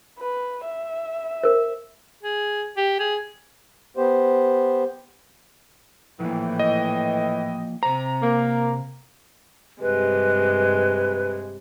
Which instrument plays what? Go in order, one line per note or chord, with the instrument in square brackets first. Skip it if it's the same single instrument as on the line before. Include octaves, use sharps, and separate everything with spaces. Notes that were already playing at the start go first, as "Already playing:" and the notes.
[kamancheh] B4
E5
[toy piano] A#4 C5
[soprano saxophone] G#4
G4
G#4
[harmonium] B3 G4 C5
[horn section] A2 E3 G5 [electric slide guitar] F3 A#3
[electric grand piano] D#5
[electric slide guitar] C3 C5 [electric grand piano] A#5
[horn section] A#3
[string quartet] G2 C3 G#3 [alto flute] B4